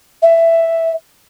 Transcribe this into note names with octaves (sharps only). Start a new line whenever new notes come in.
E5